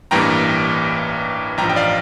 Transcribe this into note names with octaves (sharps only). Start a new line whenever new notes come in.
A1 G2 E3 G3 A#3 G5 A#5
A1 G2 F3 G5 A#5
G5
D5 F5